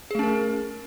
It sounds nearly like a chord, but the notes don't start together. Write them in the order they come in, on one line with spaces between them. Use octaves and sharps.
G#4 A3 C#4 A#4